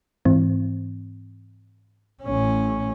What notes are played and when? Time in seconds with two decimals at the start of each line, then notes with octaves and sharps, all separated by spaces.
0.25 G#2 E3 C4
2.23 A1 C#4